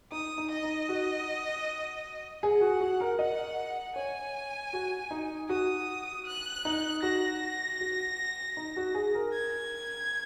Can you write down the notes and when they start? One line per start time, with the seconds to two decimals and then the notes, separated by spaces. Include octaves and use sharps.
0.12 D#4 D#6
0.38 D#4
0.51 D#5
0.63 D#4
0.89 F#4
2.43 G#4 F#5
2.61 F#4
2.81 F#4
3.00 A#4
3.19 D#5 F#5
3.96 C#5 G#5
4.73 F#4
5.11 D#4
5.49 F#4 D#6
6.27 F#6
6.65 D#4
7.03 F#4 A#6
7.80 F#4
8.57 D#4
8.76 F#4
8.95 G#4
9.15 A#4
9.34 G#6